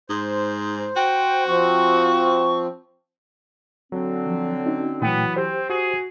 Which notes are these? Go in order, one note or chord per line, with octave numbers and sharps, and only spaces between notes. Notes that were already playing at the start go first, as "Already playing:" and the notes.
G#2 C5
F#4 G5
F3 C4 C#6
D3 F#3 C4
F3
C#4 D#4 F#4
A#2 E3 F#3 A3 B3 G5
C4 G4 C5
F#4 G#4